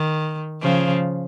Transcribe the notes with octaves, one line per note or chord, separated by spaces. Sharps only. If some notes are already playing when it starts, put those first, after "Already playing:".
Already playing: D#3
C#3 F3